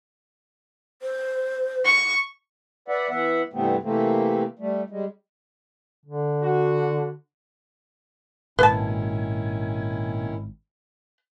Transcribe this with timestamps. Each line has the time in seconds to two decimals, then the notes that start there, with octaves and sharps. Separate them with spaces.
1.02 C5
1.85 C#6
2.88 B4 D5 E5 F#5
3.09 E3 B3 E5 F#5
3.53 G2 C3 E3 A3 B3 C4
3.83 C3 E3 A3 A#3 C4
4.59 G3 A3
4.90 G3 G#3
6.06 D3
6.44 F#4
8.59 G#1 A#2 D#3 C#4 E4 B4 G#5 A5